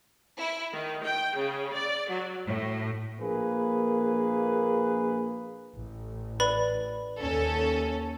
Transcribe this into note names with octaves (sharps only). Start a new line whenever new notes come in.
E4
D#3
G5
C#3
D5
F#3
A2
A#1 A#3 G#4 B4
A1
B4 D5 B5
D#2 C#4 A4